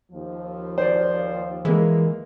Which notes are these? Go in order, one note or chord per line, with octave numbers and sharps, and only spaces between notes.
D#2 F3
C5 D5
E3 G#3 A#3